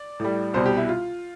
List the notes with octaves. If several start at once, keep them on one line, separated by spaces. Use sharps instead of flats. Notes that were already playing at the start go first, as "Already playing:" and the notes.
Already playing: D5
A2 G3
C2 B2 G3 C5
G4
E4
F4